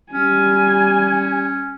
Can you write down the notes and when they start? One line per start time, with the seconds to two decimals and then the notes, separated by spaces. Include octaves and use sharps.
0.13 G3 C#4 G#5